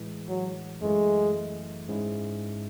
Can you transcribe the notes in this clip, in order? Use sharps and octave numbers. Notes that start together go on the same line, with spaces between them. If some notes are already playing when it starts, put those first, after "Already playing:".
Already playing: A2 E3 G#3
F#3
F#2 E3 G#3 A3
G#2 G#3 C#4 E4